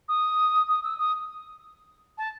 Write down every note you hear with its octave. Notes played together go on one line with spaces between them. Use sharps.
D#6
D#6
E6
D#6
A5